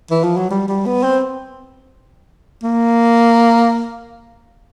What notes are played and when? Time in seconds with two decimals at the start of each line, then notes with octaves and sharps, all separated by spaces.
0.11 E3
0.24 F3
0.37 F#3
0.50 G3
0.68 G3
0.86 B3
1.03 C4
2.63 A#3